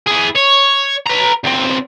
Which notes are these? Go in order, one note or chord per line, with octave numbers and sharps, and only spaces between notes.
E4 G#4
C#5
B4 A#5
C#2 C4